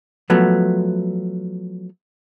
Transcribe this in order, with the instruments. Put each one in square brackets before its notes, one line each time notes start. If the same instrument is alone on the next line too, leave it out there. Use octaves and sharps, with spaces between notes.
[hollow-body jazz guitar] F3 F#3 A3 B3